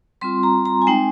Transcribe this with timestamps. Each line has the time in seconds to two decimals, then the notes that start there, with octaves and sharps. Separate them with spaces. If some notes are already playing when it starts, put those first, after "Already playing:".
0.21 G3 C4 F4 C6
0.43 A#5
0.65 A#5
0.82 G#5
0.87 G#3 C4 D#4 G5